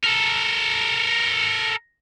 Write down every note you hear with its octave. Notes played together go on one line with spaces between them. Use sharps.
A4 A#4